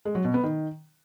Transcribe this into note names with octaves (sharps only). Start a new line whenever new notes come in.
G#3
F#3
B2
B3
D#3